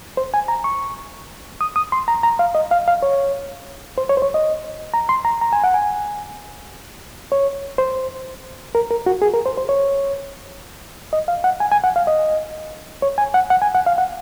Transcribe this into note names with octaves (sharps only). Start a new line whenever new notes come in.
C5
G#5
A#5
C#6
D#6
D#6
C6
A#5
A#5
F5
D#5
F5
F5
C#5
C5
C#5
C5
C#5
D#5
A#5
C6
A#5
A#5
G#5
F#5
G#5
C#5
C5
A#4
A#4
F#4
G#4
A#4
C5
C5
C#5
D#5
F5
F#5
G#5
G#5
F#5
F5
D#5
C#5
G#5
F#5
F#5
G#5
F#5
F5
F#5